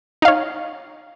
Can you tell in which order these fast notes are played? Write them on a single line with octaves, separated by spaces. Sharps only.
D#4 F5 C#5